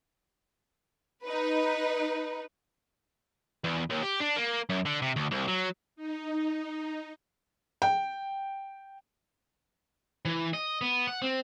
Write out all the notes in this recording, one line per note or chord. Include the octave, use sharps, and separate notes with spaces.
D#4 B4
E2
D#2
G4
D4
A#3
F#2
D3
C3
D2
C2
F#3
D#4
G5
E3
D#5
B3
F#5
C4